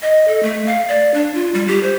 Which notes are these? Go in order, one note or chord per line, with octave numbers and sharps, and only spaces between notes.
D#5
A4
A3
F5
D5
D4
F4
G3
G4
C5